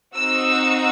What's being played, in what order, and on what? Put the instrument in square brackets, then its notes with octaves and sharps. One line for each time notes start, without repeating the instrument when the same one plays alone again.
[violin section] C4 D#4 F#4 E6